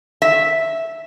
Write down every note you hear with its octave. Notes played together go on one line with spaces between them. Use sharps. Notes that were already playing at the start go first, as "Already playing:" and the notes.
E5